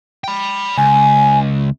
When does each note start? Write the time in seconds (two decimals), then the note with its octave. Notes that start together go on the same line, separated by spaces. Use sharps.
0.24 G5 B5
0.77 C#2 G#5